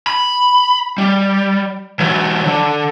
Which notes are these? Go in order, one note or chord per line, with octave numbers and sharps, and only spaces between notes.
B5
G3
E3 F#3
D3